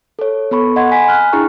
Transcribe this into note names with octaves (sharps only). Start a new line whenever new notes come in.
A4 C#5
B3 A4 B5 C#6
D#5 F#5 C6 G#6
G#5 B5 B6
F6 F#6
D4 E4 G#4 G5 A#5 C#6